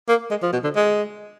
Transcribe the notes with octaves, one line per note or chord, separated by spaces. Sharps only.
A#3
G#3
F3
B2
D3
G#3